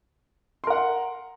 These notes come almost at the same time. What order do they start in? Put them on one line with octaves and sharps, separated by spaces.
C6 A#4 F#5